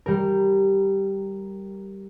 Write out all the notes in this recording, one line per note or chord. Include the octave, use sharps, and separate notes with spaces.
G3 A#4